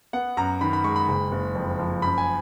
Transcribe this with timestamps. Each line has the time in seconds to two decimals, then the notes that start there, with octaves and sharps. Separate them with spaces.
0.13 B3 F#5
0.37 F#2 A#5
0.61 D#3 B5
0.73 B5
0.84 G#3 C#6
0.96 B5
1.08 F#1
1.32 F#1
1.55 F2
1.79 F3
2.02 F#2 B5
2.18 G#5